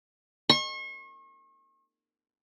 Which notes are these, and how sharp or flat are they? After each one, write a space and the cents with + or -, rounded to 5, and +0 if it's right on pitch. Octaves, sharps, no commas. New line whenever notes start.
C#6 -40